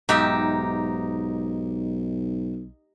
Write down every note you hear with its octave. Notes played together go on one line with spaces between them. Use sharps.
B1 G#2 D#4 G4 E5